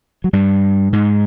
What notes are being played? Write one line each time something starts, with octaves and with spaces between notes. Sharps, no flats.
F#3
G2 G3
G#2 G#3